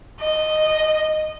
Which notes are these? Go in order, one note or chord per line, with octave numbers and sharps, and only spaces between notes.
D#5